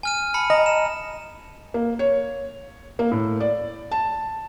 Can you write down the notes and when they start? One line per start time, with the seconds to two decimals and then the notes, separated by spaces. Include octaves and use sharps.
0.03 G#5 F6 D#7
0.34 A5 B5 C#7
0.50 D#5 A#5
0.66 E7
1.74 A#3
1.99 C#5
2.99 A#3
3.11 A2
3.40 D5
3.91 A5